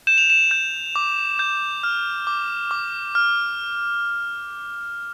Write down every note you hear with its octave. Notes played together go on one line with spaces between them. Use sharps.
G6 E7
F7
E7
G6
D6
G6
F6
D6
D6
F6